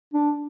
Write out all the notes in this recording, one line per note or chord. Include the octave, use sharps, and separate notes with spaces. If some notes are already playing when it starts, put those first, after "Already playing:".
D4